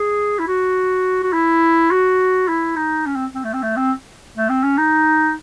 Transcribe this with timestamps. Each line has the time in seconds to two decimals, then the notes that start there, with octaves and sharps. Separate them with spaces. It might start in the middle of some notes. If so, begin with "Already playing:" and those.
Already playing: G#4
0.39 E4
0.48 F#4
1.24 F#4
1.33 E4
1.91 F#4
2.48 E4
2.76 D#4
3.06 C#4
3.16 C4
3.35 C4
3.44 A3
3.54 C4
3.63 A3
3.77 C4
4.38 A3
4.49 C4
4.64 C#4
4.78 D#4